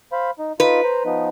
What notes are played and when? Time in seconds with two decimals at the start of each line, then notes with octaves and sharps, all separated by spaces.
0.12 C5 F5 B5
0.39 D#4
0.60 D#4 F4 B4
0.84 C5 A#5
1.05 F3 B3 D#4